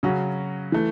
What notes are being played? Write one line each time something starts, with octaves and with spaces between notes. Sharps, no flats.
C#3 F#3 C#4 F#4
E3 A3